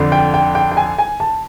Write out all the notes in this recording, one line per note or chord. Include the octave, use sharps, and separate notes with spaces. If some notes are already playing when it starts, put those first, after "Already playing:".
Already playing: F2 D3
G5
G5
G5
G5
G#5
G#5
A5